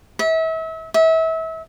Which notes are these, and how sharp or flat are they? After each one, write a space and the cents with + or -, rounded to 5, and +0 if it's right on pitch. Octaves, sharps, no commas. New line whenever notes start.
E5 -35
E5 -30